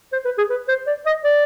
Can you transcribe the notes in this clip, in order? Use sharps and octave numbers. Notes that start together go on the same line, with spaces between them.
C5
B4
G#4
B4
C5
D5
D#5
D5